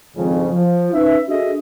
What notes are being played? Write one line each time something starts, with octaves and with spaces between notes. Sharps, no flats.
G#1 F2 C#3
F3
C#4 D#4 B4 E5
D4 F#4 G#4 A4 D#5 E5